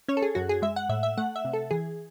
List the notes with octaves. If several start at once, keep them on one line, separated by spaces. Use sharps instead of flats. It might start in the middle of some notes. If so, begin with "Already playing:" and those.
C#4 C#5
A4
G#4
F#2 F#4
G#4
G#3 E5
F#5
A2 E5
E5
A3 F#5
E5
C3
A4
E3 G#4